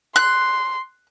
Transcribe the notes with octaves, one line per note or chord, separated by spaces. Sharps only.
C6 F#6